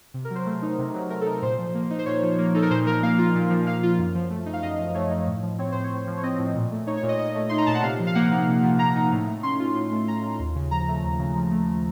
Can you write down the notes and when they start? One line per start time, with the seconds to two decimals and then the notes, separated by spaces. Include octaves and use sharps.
0.14 C3
0.25 A#4
0.30 F#3 C5
0.46 A3
0.62 D#4
0.78 C3
0.94 F#3
1.10 A3 A#4
1.21 A4
1.26 D#4
1.32 A#4
1.42 A#2 C5
1.58 F3
1.74 A#3
1.90 D#4
1.99 C5
2.06 A#2 C#5
2.22 F3
2.38 A#3
2.55 D#4 A4
2.62 A#4
2.71 A#2 C5
2.86 F3 A#4
3.03 A#3 F5
3.18 F4
3.35 A#2
3.50 F3
3.67 A#3 F5
3.83 F4
3.99 F#2
4.15 F3
4.30 A3
4.46 D#4
4.53 F5
4.63 F#2 D#5
4.79 F3
4.94 A3 C#5
5.11 D#4
5.27 A2
5.43 F3
5.59 C4 C#5
5.72 A2 C5
5.84 C#5
5.91 A2
6.07 F3
6.17 C#5
6.23 C4 D#5
6.39 A2
6.55 A#2
6.71 A3
6.87 D#4 C#5
6.97 C#5
7.03 A#2
7.09 D#5
7.19 A#2 D#5
7.35 A3
7.49 D#4 C6
7.58 A#5
7.66 A#2 A5
7.75 F#5
7.83 C3 F5
7.99 F3
8.07 F5
8.15 A#3 F#5
8.31 D#4
8.47 C3
8.63 F3
8.79 A#3 A#5
8.96 D#4
9.12 A2
9.27 A3
9.43 C#4 C6
9.60 F4
9.75 A2
9.91 A3
10.07 C#4 A#5
10.23 F4
10.39 D#2
10.55 C#3
10.71 F3 A#5
10.88 A3
11.04 D#2
11.19 C#3
11.36 F3
11.51 A3